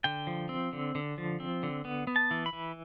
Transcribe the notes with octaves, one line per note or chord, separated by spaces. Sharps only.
D3 G5
F3
C4
D3
D3
F3
C4
D3
B3
B3
A5
E3
B5
E3